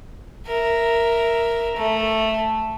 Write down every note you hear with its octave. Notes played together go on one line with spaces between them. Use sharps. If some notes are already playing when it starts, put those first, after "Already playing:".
A#4 E5
A3